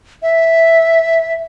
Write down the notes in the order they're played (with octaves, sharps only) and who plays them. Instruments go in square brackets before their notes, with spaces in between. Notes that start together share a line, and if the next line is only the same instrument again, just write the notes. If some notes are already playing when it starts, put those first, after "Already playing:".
[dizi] E5